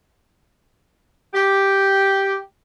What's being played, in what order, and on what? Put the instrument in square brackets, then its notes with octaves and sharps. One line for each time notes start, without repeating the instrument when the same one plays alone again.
[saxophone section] G4